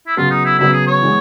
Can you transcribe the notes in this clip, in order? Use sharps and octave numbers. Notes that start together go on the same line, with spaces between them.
E4
C#3 F#3 B3 F4
D#4
E4
C#3 F#3 B3 E4
G#4
C#5
E3 G#3 B3